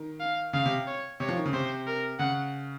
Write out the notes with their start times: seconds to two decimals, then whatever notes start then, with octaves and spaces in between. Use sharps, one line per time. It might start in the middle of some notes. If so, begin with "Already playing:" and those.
Already playing: D#3
0.20 F5
0.53 C#3 F5
0.66 C3
0.87 C#5
1.20 C3 C#5
1.29 F3
1.36 D#3
1.45 C#3
1.53 C3 C5
1.87 A#4
2.19 C#3 F#5